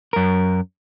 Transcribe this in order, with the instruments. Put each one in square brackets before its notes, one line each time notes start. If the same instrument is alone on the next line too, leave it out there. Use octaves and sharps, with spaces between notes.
[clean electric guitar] F#2 A#4